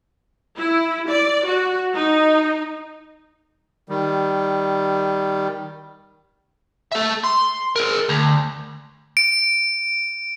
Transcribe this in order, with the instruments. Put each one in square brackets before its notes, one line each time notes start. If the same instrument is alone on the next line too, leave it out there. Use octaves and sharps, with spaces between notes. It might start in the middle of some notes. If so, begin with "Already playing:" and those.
[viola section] E4
D5
F#4
D#4
[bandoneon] D#3 G3
[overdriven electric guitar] A4 E5
C6
G#4 A#4
D2
[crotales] D7